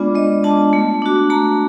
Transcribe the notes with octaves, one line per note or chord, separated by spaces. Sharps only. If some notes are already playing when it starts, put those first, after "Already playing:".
Already playing: G#3 B3 D4 F4 D5
G#3 D#5
B3 D4 F4 A5
A3
D4 F#4
A3 A#5